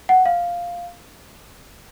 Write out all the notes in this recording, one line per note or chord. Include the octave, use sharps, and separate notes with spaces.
F#5
F5